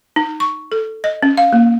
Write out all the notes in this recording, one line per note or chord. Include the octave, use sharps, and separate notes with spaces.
D#4
C#6
A4
D#5
C#4
F5
A#3